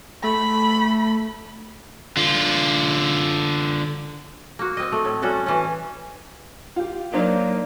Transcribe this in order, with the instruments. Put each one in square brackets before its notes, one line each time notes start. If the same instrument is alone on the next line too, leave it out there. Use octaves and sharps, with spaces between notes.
[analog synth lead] A3 [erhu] B5
[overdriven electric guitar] D3 F4
[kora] A#3 F#4
C4 D#5
A3
A2
G3 C#4 F#4 A4
E3 C#4
[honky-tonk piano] F4 G4
[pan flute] F#3 [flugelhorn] A#3 [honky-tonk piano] D4 D#4 C5 [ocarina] D5